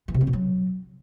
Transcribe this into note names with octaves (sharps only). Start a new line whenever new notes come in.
E3
C3
C4
B2
F#3